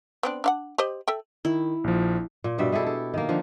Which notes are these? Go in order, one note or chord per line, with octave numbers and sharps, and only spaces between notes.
B3 C4 D4
D4 F5 F#5
G4 C5 D#5
A4 E5 G5
D#3 E4
A#1 F3
A#2
G2 B2 G3 E5
G#3 E4 G4 A4
A4
D#3 A#3
D3 F3